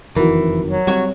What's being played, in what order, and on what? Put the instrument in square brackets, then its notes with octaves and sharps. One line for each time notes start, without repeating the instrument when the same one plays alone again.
[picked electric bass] F#1 F2 D#3 [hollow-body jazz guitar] E3 [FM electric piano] F#4 A#4
[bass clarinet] F#3
[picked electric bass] G3 C4 [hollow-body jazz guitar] F#4 C#5